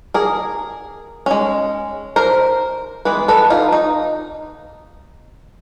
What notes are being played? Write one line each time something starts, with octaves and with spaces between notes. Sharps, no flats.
G#4 A#4
G#3 C#4
A#4 C5
E3 G#3 B3 B4
A4 B4
D#4 F4
D#4